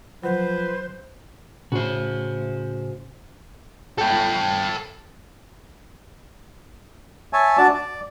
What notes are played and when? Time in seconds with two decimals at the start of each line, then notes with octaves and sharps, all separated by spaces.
0.23 D3 F3 F#3 B4 C5
1.72 A2 C#3 F#4 C5
3.98 A4 G5
7.33 C#5 E5 G#5 A5
7.57 D4 F#4 D5 A5
7.74 D5